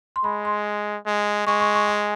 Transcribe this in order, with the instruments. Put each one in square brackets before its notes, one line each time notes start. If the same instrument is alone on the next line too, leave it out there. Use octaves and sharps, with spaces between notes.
[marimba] C6
[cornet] G#3 [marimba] B5
[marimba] C6
[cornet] G#3
[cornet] G#3 [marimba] C#6
[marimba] C#6
C#6
G#5